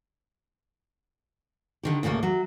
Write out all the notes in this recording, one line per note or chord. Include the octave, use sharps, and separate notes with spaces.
D3 D#3 G4
D2 A2 C#3 A3 A#3
F#3